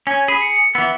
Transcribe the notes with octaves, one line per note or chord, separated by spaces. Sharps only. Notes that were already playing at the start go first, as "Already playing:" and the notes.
C#4 G#5
G#4 B5
C#7
E3 B3 E6